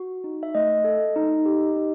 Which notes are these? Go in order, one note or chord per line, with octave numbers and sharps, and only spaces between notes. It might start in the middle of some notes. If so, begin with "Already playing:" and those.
Already playing: F#4
D#4
E5
A3 D#5
A4
D#4
G4
D#4